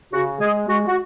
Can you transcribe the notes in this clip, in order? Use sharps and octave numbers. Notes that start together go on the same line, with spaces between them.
C#3 F#4
G#3 G#4
G#3 F#4
F#4